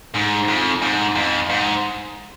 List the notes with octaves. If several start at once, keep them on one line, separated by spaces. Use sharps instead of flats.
G#2
F2
G#2
F2
G#2